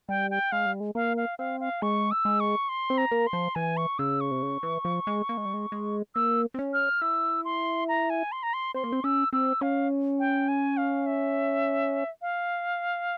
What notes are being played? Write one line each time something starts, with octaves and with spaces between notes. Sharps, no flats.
G3 G5
G5
G#3 F5
G3
G#3
A#3 F5
F5
C4 F5
F5
G#3 C#6
E6
G#3
C#6
C6
C4
A#5
A#3
C6
F3
E3 G#5
C#6
C#3 E6
C#6
C3
C#3
E3
F3
G#3
A#3
G#3
G3
G#3
G#3
A#3 E6
C4
C#4
F6
E4 E6
C6
A#5
G#5
C6
A#5
C6
C4 C6
A#3
C4
C#4 E6
C4 E6
C#4 F5
G5
G#5
F5
E5
F5